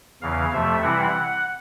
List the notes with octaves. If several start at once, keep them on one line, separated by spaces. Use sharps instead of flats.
E2 C#3 E3 F5
F2 C3 F3 A3 E5
C3 E3 G3 C4 E4 F#5